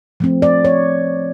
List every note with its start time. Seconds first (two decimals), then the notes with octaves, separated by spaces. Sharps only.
0.20 F3 A3 C4
0.42 D5
0.65 C#5